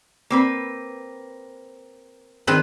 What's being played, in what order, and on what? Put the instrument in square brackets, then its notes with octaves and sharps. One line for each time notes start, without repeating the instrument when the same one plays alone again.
[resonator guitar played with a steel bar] A#3 C4 B4
[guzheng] D#3 C4 B4